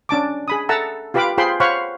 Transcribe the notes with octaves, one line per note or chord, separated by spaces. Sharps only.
C#4 D4 A5 D6
G#4 B5 D#6
A4 E5 F#5 A5 A#5 E6
F4 G4 B4 F5 B5 D6
F4 G#4 C5 G5 B5 C6
C5 C#5 F5 F#5 B5 C#6